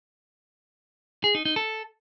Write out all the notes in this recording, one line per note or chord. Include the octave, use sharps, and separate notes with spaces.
G#4
D#4
D#4
A4